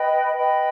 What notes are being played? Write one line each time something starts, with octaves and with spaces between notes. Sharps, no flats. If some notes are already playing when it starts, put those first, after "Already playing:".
Already playing: B4 D#5 G5 B5
B4 D#5 G5 B5